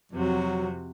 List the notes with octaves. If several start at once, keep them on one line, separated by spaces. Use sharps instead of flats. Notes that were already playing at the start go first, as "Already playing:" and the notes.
F2 C3 F#3 F#4